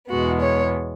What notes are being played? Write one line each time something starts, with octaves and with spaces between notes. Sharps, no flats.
E2 B2 G#3 B3 F#4
C#5